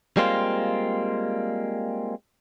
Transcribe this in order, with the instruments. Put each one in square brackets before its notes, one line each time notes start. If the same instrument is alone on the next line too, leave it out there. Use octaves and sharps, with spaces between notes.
[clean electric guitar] G3 G#3 A#3 C4 F4